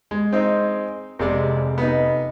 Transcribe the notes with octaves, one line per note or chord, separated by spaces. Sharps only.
G#3
C4 D#4
F1 C3 G#3 D5
B3 D#4